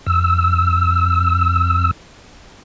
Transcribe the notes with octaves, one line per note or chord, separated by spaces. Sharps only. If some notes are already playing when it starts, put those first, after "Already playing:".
F2 E6